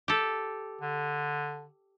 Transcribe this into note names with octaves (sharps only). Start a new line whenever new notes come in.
G4 A4
D3